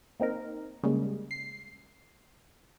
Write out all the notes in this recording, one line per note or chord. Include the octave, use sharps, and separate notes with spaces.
A#3 C4 D#4 A#4
C#3 G3 G#3 A#3
C7